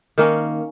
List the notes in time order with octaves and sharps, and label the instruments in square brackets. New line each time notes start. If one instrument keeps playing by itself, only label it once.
[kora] D#3 A#3 C#4